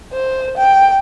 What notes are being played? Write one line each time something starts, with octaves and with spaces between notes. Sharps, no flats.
C5
G5